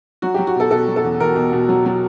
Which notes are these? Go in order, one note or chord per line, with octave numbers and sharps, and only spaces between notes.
F#3 F#4
G4
F#3
F#4
B2 A4
B2 A4
F#3
A4
E2
E2 A#4
B2
B2
F#3
F#3